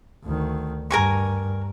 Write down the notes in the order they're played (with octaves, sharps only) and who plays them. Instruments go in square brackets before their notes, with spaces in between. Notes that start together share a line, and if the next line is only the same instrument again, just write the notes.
[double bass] D2 D#3
[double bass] G2 [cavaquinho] A#4 G#5 C#6